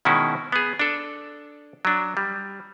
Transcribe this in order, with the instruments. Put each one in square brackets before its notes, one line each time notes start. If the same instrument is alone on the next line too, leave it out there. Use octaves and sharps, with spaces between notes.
[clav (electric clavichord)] B2 D#3 G#3 C#4 E4 F#4
B3 G#4
D4 A4
F#3 D4
G3